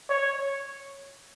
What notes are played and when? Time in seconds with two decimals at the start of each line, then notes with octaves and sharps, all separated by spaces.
0.10 C#5